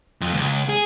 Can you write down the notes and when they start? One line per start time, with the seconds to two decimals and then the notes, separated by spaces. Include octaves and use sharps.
0.21 F2
0.34 C#2
0.69 G#4